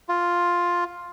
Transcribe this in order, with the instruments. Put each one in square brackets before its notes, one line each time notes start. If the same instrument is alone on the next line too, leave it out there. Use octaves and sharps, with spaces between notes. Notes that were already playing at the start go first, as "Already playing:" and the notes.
[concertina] F4